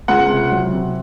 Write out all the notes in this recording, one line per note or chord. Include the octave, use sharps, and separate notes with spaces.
C#2 F#5
C3
F#3
C3